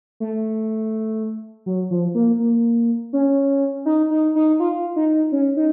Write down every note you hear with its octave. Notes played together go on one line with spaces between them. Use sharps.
A3
F#3
F3
A#3
A#3
C#4
D#4
D#4
D#4
F4
D#4
C#4
D#4